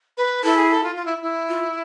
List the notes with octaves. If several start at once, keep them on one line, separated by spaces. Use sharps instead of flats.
B4
E4 A4
G#4
A4
F4
F4
E4
E4
F4